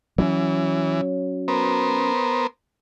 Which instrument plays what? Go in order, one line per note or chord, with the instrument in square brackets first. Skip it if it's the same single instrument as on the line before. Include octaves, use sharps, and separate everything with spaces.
[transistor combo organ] E3 [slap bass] F#3 C4 C#4
[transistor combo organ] B3 A#4 C5